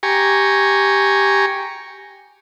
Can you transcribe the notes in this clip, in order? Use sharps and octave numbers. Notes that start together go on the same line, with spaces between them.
G4 G#5 A#5 C#6